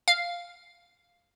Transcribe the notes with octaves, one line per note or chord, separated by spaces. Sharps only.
F5